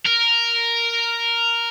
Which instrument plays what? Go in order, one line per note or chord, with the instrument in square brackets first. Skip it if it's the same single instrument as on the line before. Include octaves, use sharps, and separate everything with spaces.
[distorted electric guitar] A#4